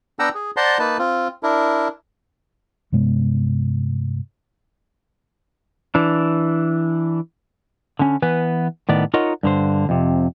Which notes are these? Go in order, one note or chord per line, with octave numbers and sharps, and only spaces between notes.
B3 D4 F#5 G5 A#5 E6
G#4
C5 D5 F#5 A5 A#5 C6
A#3 D#4 B4 A5
C4 F4
D4 E4 A#4
G2 C3 G#3 B3
E3 D4
D3 C#4
E3 B3 B4 G#5
A2 D#3 B3 D5
D#4 F4 A#4 C#5 D#5 F#5
G2 D3 C5
F2 C3